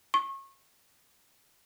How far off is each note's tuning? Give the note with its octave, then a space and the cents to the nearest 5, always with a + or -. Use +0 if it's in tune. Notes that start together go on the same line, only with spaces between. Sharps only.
C#6 -30